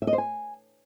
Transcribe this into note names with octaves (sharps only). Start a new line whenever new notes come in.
E5
D#5
C5
G#5